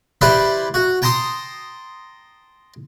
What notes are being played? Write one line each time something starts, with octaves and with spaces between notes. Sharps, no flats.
E4 G4 B4 C5 D5 E5
F#4
G5 A5 A#5 C6 D#6